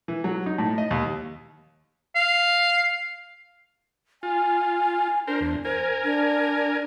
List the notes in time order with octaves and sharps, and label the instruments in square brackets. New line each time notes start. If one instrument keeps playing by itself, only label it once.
[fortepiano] E3
F#3
D#4
A2
D#5
D#2
[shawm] F5
[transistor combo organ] F4 [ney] G#5
[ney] D4 [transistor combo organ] A#4 C5
[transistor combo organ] E2
[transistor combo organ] A#4 G#5 [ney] C5
[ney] D4